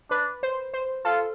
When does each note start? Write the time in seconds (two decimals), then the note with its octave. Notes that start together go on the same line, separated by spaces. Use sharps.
0.10 D4 B4
0.43 C5
0.74 C5
1.05 F4 A4